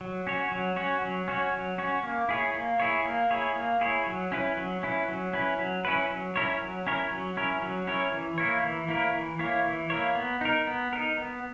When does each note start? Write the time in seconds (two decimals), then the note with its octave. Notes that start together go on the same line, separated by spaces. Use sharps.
0.01 F#3
0.27 C#4 F#4 C#5
0.52 F#3
0.76 C#4 F#4 C#5
1.02 F#3
1.28 C#4 F#4 C#5
1.54 F#3
1.78 C#4 F#4 C#5
2.03 A#3
2.29 E4 G#4 C#5
2.54 A#3
2.80 E4 G#4 C#5
3.05 A#3
3.31 E4 G#4 C#5
3.56 A#3
3.81 E4 G#4 C#5
4.07 F#3
4.32 C#4 E4 B4
4.57 F#3
4.83 C#4 E4 B4
5.08 F#3
5.33 C#4 E4 B4
5.59 F#3
5.85 C#4 E4 B4
6.10 F#3
6.36 C#4 E4 A#4 C#5
6.61 F#3
6.87 C#4 E4 A#4 C#5
7.11 F#3
7.37 C#4 E4 A#4 C#5
7.62 F#3
7.87 C#4 E4 A#4 C#5
8.12 E3
8.38 A#3 E4 A#4 C#5
8.64 E3
8.88 A#3 E4 A#4 C#5
9.14 E3
9.39 A#3 E4 A#4 C#5
9.65 E3
9.90 A#3 E4 A#4 C#5
10.15 B3
10.41 D#4 A#4
10.67 B3
10.93 D#4 A#4
11.18 B3